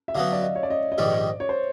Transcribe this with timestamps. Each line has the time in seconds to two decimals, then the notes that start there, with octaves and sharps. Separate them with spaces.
0.08 E5
0.15 D3 F#3 B3 F5
0.33 D5
0.42 D#5
0.55 C#5
0.63 D5
0.70 D#5
0.92 D#5
0.98 A#1 G#2 D#3 G3 D5
1.40 C#5
1.49 C5